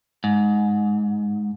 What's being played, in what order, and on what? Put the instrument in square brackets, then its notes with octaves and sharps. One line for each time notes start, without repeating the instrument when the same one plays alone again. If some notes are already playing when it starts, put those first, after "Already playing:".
[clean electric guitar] G#2